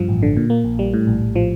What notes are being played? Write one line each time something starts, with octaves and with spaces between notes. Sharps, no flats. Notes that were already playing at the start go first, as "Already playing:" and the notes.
Already playing: G2 F3
A1
D3
A#2
A#3
A#1
G3
A2
A#1
A#1
F3